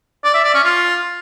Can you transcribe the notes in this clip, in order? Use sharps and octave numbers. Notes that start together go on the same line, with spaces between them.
D5
E5
D5
C#4
F4